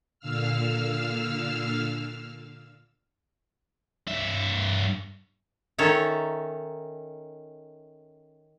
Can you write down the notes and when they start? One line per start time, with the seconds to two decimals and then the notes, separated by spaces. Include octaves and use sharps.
0.19 A#2 D3 F5 E6 F6
4.07 G2 E5
5.78 D#3 C#4 A4 C#5 E5 A#5